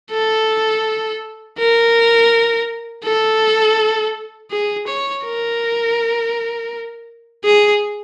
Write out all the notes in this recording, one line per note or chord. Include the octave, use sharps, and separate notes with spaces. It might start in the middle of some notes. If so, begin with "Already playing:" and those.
A4
A#4
A4
G#4
C#5
A#4
G#4